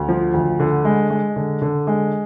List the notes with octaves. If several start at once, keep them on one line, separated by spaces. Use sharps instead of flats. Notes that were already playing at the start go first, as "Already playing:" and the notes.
Already playing: D2
F3
D2
D3
G#3
G#3
D3
D3
G#3